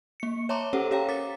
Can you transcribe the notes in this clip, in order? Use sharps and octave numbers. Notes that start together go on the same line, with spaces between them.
A#3 C#7
C#5 E5 A5 A#5 C6 D6
C#4 G4 A4 C5 F#5
G4 C#5 F5 G5 A#5
A#4 D6 A6 B6